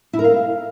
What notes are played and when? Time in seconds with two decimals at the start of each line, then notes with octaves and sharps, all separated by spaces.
0.13 E4
0.19 A#4
0.24 F5